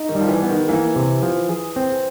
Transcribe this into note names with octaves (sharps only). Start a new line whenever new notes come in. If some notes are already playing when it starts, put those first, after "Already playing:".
Already playing: D#4
D#3
G3
F3
E3
B3
D#3
E3 A#3
C3
F3
G#4
C4